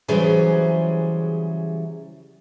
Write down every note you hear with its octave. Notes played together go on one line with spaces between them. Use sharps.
C#3 E3 F#3 G3 G#4 C5